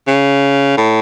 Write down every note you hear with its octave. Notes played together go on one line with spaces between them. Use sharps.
C#3
A2